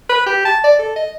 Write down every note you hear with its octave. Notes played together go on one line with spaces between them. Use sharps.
B4
G4
A5
D5
A4
D#5